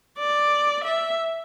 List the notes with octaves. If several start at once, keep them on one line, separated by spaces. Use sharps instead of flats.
D5
E5